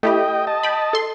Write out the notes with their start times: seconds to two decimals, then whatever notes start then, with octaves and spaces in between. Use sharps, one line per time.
0.03 A3 E4 G4 D#5 G5
0.47 D#5 A5
0.63 G5 B5
0.93 A4 C6